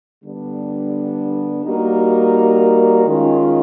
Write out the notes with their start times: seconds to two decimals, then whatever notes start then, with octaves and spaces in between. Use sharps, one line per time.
0.23 D3 G3 B3 D4
1.64 G3 A#3 D#4 F#4 A#4
3.06 D#3 G#3 C#4 F4